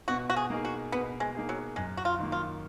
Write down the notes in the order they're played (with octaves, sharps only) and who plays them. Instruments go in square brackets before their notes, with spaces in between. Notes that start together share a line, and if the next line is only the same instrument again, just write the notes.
[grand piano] B2 [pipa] F#4
[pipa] F#4
G#4
[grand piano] A#3 D#4 G#4
[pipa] F#4
[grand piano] B2 [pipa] B3
[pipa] G#3
[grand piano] A#3 D#4 G#4
[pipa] F#3
[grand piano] F#2 [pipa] G#3
[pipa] F#4
F4
[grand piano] D#3 A#3
[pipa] F4